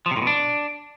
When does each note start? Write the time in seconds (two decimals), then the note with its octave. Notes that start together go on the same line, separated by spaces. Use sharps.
0.06 F3
0.11 C3
0.16 A2
0.22 B2
0.27 D4